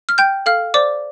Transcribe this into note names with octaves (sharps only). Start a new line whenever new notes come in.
F6
G5 G6
A4 F5 F6
C5 D5 D6